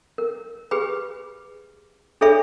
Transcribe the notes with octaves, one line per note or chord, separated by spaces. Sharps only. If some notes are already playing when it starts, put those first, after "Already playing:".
A#4
G4 G#4 B4 B5
D4 G#4 A4 C#5 E5 B5